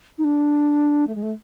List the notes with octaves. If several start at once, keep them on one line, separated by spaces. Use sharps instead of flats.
D#4
D4
A3
G#3
A3